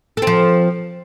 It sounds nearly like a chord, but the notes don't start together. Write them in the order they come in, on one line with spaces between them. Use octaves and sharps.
A4 C4 F3